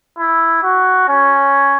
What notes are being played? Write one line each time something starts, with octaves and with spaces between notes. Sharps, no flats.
E4
F#4
C#4